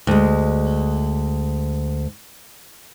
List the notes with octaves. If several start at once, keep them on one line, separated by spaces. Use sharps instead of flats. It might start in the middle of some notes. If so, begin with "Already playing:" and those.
D2 G#3